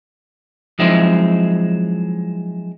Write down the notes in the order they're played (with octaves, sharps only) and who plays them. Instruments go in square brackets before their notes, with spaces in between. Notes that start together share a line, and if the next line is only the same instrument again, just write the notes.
[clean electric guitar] F3 F#3 G#3 C4 D#4 E4